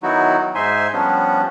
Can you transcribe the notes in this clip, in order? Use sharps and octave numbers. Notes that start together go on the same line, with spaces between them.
D#3 F#3 B3 D#4 E4 F#4
G#2 D#4 C5 E5 G#5 C6
F3 G3 B3 C#4 D4